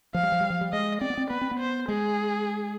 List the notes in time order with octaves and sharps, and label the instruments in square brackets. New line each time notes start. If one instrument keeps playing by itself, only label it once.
[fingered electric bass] F3 [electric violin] F5
[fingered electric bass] G3
F3
G3
F3
G3
[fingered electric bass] G#3 [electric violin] D#5
[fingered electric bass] C4 [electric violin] D5
[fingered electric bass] B3
C4
[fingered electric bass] B3 [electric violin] B4
[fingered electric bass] C4
B3
[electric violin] C5
[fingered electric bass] G#3 [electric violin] G#4